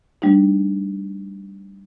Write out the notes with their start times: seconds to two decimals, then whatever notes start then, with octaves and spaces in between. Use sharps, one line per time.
0.22 G3 A3 D4 D#4